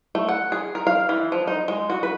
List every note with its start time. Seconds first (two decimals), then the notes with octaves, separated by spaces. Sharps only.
0.15 A3
0.29 F#5
0.52 G#4
0.75 A#4
0.87 F5
1.09 E3
1.32 F3
1.47 D#4
1.68 G#3
1.90 F#4
2.03 B4